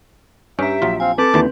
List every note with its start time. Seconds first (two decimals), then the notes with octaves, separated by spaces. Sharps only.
0.59 G2 C#4 G4 E5 A#5
0.82 A#1 F#3 F4
1.00 C4 F5 G#5
1.18 C4 A4 B4 A5 D6
1.34 D#2 D3 E3